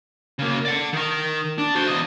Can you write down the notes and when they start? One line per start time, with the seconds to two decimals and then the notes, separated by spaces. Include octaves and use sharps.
0.39 C#3 A#3
0.65 D5 F#5
0.93 D#3 A#4
1.58 D4
1.75 F#4 C5
1.87 E2 D#5